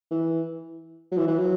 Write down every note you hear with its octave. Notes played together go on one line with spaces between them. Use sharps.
E3
F#3
E3
E3
F#3